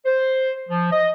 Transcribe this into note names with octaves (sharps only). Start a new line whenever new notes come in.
C5
F3
D#5